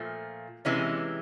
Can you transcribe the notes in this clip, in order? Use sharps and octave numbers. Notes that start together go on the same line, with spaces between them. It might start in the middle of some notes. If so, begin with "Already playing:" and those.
Already playing: A#2 F3 A3
C3 E3 G#3 C#4 E4